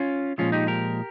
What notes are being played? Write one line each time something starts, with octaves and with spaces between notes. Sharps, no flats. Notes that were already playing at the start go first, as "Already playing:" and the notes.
Already playing: C#4 F4
A#2 F3 G#3 C#4 F4
D#4 G4
G4 A#4